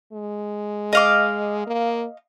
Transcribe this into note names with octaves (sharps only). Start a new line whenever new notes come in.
G#3
D#5 F5 D6
A#3